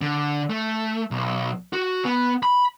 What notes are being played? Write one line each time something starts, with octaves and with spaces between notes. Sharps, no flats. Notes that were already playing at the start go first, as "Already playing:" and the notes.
D3
A3
B1
F#4
B3
B5